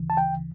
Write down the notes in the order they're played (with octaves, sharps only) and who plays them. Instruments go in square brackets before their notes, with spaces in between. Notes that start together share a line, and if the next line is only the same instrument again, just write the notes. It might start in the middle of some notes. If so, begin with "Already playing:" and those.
Already playing: [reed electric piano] D2 C#3 E3
A5
G5